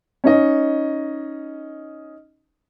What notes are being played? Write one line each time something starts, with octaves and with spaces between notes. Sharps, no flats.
C#4 D#4 D#5